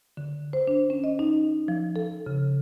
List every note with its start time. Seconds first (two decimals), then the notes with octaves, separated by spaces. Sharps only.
0.17 D3
0.53 C5
0.68 D4
0.90 C#4
1.04 D#5
1.19 D#4
1.68 F3
1.96 A4
2.26 C#3